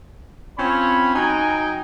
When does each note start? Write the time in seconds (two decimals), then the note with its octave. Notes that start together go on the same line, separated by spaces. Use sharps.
0.59 C4 C#4 F4 C#5 B5
1.16 F#3 D#4 D#5 G5 G#5